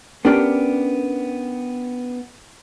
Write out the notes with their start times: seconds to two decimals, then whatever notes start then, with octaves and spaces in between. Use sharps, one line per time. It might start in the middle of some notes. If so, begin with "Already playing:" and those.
0.25 B3 C#4 D4 G4 A#4 D5